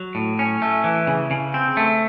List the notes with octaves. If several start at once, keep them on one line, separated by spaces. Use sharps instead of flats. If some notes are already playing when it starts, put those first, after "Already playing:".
Already playing: F#3
A2
C#4
A3
E3
C#3
C#3
C4
A3